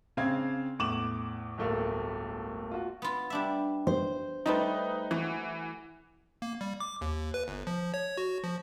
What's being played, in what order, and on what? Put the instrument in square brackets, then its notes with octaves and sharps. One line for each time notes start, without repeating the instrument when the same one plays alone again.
[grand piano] C#3 C4 D4 F5 G#6
E2 A2 D6 E7 F#7
D1 G1 A3 A#3
F4 F#4
[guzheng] B3 F4
G3 D4 E5
[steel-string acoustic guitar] C5
[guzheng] G3 A3 F4 [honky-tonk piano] D#4 B4
[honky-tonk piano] E3 [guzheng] F#4
[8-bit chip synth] A#3
G3
D6
D#2
B4
G1
F3
C#5
F#4
F3